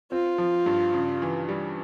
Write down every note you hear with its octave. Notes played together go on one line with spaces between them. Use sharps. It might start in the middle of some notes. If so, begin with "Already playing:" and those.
C4 F4
F3
G2
C#3
E3
G3